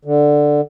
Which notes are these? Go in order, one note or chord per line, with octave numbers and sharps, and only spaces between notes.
D3